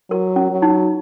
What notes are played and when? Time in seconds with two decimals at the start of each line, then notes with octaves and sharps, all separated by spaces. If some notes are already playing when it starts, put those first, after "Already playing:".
0.11 F#3 A#4
0.36 C#4
0.50 F#3
0.62 D#4